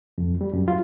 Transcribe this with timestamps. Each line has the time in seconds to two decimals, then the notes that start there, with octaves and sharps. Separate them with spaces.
0.18 F2
0.41 G3
0.53 F#2
0.68 F4